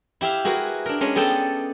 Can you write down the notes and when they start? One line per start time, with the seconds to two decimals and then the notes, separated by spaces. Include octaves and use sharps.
0.21 E4 G4 E5 F5
0.45 F#4 G#4 A#4 B4
0.86 D4 A#4
1.01 G#3 C#4 D4
1.16 B3 G#4 A4 G5 A5